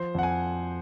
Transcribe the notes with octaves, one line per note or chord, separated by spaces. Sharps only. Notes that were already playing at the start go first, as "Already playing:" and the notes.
Already playing: F3 C5
F2 F#5
G#5